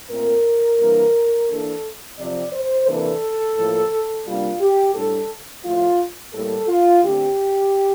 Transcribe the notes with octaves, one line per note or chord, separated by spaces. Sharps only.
A#2 A3 C4 A#4
E3 G3 A#3 D4
E3 A#3 D4 A4
C3 F3 C4 D5
C5
C3 E3 A#3 D4 A4
A2 F3 A#3
C3 G3 A#3 D4 F4
G4
A2 G3 D4 A4
A2 F3 A3 F4
A2 G3 A#3 A4
F4
D3 A3 C4 G4